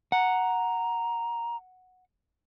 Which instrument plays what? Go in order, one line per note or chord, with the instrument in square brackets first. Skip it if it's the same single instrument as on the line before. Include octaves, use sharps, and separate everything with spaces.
[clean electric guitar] F#5 [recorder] A#5